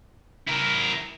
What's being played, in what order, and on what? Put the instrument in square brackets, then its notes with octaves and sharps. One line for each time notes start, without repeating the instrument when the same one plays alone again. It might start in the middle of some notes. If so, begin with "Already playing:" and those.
[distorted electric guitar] E4 A#4